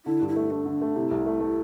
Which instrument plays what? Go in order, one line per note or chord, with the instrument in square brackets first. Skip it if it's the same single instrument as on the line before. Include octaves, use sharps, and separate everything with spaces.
[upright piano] D3 [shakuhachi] E4
[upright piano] G2
[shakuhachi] E4
[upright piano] A3
[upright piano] A3 [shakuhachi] D4
[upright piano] D3
A3
[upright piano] C3 [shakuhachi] E4
[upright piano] C2
A3
A3